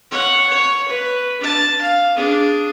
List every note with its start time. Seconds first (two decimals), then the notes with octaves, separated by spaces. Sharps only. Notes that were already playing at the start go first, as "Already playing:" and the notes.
0.11 C#5 F#5
0.49 C#5
0.89 B4
1.41 D4 A5
1.82 F5
2.16 D4 G#4